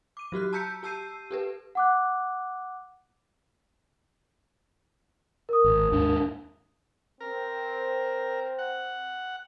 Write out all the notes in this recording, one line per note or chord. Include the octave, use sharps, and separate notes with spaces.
D6 D#7
F#3 F#4 G4 F#6
A5 A#5 E6 G6 B6 C#7
G4 A5 E6 G6 C7 D#7
G4 A4 B4
F#5 D6 F#6
A#4 D#6
G#1
D#2 G#2 D4
C4 A#4
F#5